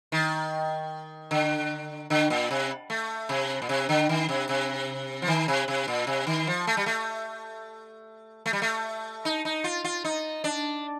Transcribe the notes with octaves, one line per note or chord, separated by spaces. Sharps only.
D#3
D3
D3
A#2
C3
A3
C3
A#2
C3
D3
D#3
C3
C3
F3
D#3
C3
C3
A#2
C3
D#3
F3
A3
G3
A3
A3
G3
A3
D#4
D#4
F4
F4
D#4
D4